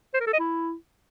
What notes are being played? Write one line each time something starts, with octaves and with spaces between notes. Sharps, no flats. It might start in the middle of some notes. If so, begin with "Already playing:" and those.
C5
A#4
A4
D#5
E4